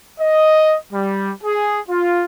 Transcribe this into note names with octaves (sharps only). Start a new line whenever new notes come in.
D#5
G3
G#4
F4